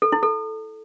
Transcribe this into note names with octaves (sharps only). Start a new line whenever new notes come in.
A4
E4
A4